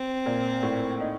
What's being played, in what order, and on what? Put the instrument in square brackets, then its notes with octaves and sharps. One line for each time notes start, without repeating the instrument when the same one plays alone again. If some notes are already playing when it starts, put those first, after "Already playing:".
Already playing: [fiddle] C4
[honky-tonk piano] A#2
A2
D#4